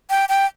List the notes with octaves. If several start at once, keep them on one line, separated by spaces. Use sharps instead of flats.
G5
G5